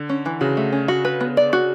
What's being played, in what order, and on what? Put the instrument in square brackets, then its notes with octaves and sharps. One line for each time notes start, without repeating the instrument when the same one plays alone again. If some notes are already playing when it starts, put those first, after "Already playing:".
Already playing: [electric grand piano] D3
[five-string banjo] C#4
E3
[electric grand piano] C#3 [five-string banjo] F#4
[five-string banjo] A3
C#4
F#4
B4
B3
D5
F#4